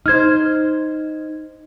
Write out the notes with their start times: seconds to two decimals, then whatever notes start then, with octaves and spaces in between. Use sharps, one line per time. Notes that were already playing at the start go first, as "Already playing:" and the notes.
0.06 D#4 C5 F6 G#6